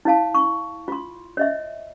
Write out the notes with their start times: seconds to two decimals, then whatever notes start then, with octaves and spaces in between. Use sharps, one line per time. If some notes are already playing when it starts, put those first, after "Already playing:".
0.05 E4 C#5 F5 A5
0.35 C#6
0.88 F4 C6
1.37 C#5 D#5 E5